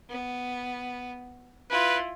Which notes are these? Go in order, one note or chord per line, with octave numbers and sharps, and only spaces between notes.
B3
E4 F4 B4